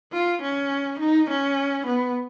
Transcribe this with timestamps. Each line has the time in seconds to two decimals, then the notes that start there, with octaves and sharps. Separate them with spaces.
0.13 F4
0.42 C#4
1.00 D#4
1.30 C#4
1.87 B3